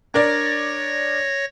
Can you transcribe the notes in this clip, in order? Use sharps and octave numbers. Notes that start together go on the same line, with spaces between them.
D4 A#4 C#5 D5 A#6